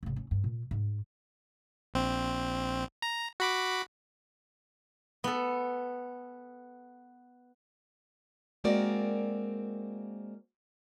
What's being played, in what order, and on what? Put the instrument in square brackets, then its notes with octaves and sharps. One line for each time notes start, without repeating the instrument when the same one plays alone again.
[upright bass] G#1 C#3
C#4
G2
A#2
G#2
[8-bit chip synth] A#1 C4
A#5
F#4 B5 D6
[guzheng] B3 A4
[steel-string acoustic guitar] G#3 A#3 C4 F#4 A#4 D5